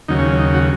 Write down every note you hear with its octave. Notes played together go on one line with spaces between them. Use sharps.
D#2 C#3 F#3 D#4
C#4
C#4
D#4
F#4